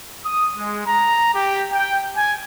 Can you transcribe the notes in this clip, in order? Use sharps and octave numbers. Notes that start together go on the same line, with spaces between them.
D#6
G#3
A#5
G4
G5
G#5